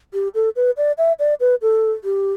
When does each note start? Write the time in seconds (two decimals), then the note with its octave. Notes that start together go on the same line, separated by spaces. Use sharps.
0.14 G4
0.35 A4
0.56 B4
0.77 D5
0.98 E5
1.19 D5
1.40 B4
1.62 A4
2.04 G4